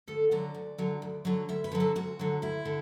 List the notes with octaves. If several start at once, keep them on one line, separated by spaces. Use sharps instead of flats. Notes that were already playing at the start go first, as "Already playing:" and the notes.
D2 A4
D3 F#3 D5
D2
D3 F#3
D2
D3 F#3
D2 E5
B4
D3 F#3
A4
D2 F#4
D3 F#3
D2 E4
D3